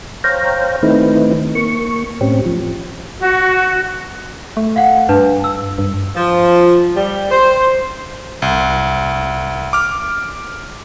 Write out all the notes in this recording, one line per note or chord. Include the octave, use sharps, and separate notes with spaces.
C5 C#5 F5 G5 A#5
D#3 A3 C4 D#4 E4 B4
A#3 C#6
A2 C4 C#4 G4
F3
F#4
A3
F5 F#5
G2 D4 B4 A5
E6
G2
F3
G3
C5
C2
D6 F6